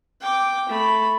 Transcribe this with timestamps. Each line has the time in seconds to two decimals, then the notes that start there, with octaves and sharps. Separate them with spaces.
0.21 G5 D6
0.69 A3 B5